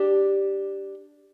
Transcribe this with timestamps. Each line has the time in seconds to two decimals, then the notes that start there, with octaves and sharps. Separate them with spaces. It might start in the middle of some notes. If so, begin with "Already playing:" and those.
Already playing: D4 G4